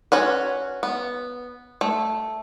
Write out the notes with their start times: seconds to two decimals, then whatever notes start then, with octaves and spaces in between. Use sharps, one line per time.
0.12 C#4 F#4 B4
0.83 B3
1.81 A3